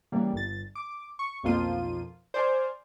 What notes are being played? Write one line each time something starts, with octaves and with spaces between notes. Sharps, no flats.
C#3 E3 G3 A#3
G1 A6
D6
C#6
B1 F2 F3 A#3 F4 D#7
C5 D5 G#5 F6